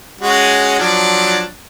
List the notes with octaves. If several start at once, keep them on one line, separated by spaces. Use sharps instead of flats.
G#3 C#4 F#4
F3 F#3 D4